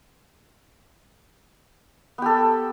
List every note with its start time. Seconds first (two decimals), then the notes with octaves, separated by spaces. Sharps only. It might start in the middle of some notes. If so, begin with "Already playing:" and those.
2.18 B3
2.22 G4
2.26 A4